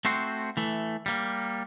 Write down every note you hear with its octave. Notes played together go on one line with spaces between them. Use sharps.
A3 C4 F#4 C5
E3 A3
G3 A#3